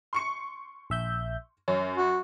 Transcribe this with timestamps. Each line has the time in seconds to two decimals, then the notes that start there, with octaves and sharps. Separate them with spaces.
0.13 C6 C#6 C#7
0.90 A#1 E5 G6
1.68 F#2 C#4
1.98 F#4